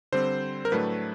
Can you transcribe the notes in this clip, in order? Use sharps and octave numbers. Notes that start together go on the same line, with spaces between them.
D3 G3 C4 C5
A#4
A2 F#3 A3 D4 B4